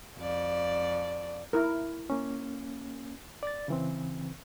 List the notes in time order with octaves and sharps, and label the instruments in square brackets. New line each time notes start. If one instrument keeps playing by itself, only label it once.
[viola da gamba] F2 D5
[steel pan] E4 A#4
[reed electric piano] A#3 C#4
D5 A6
C#3 E3 C4